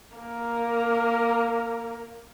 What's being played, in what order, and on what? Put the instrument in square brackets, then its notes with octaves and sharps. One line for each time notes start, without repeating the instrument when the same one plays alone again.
[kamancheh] A#3 A#4